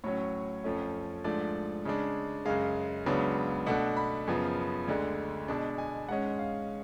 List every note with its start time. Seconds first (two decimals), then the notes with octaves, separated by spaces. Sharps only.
0.04 A2 F#3 C#4 C#5
0.64 F2 F3 A3 C#4
1.24 G#2 F3 A3 D4 D5
1.85 C#3 G#3 D4
2.45 F#2 C#3 G#3 F5
3.06 C#2 C#3 F#3 B3 D4
3.66 B2 A3 D4 F#5
3.97 B5
4.27 F#2 C#3 F3 B3
4.88 D2 D3 G#3
5.48 B2 G#3 D4 A5
5.78 G#5
6.09 G#2 G#3 C#4 F#5
6.39 F5